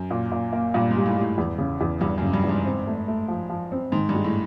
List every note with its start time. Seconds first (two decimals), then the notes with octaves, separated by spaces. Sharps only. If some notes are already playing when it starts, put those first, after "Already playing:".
Already playing: F#2
0.11 A#2
0.32 A#2
0.53 A#3
0.74 G2 A#2
0.91 G#2 G3
1.06 A2
1.16 G3
1.21 A2
1.38 E2
1.58 C#3
1.81 E2
2.01 E2 G2
2.18 F#2 C#3
2.33 G2
2.44 E2
2.49 G#2
2.65 C4
2.87 A3
3.08 A3
3.28 F3
3.50 F3
3.72 C4
3.92 G#2 D#3
4.09 G2
4.14 G#3
4.24 A2